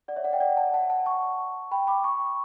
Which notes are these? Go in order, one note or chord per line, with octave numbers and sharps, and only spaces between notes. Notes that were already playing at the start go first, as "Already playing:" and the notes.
D5 F#5
C#5 E5
D5 F#5
E5 G5
D5 F#5
F#5 A5
F#5 A5
F#5 A5
A5 C#6
G5 B5
B5 D6
A5 C#6